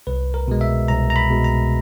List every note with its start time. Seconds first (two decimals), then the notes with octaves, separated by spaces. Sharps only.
0.07 C2 B4
0.34 A#4
0.48 B2 G#3
0.61 E5
0.88 C2 A#5
1.10 A#5
1.16 B5
1.30 B2 G#3
1.44 A#5